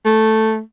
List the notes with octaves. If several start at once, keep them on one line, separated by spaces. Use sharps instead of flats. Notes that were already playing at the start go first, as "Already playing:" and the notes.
A3